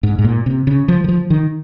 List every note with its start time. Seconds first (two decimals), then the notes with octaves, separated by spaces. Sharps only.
0.03 G#2
0.19 G#2
0.24 A#2
0.46 C3
0.67 C#3
0.88 F3
1.04 D#3
1.08 F3
1.30 D#3